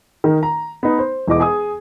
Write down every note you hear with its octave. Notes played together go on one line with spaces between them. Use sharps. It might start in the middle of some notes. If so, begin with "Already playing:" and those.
D#3 D#4 A#4
A#5
B3 D#4
C5
E1 E3 D#5 D6
G#4 G#5 D#6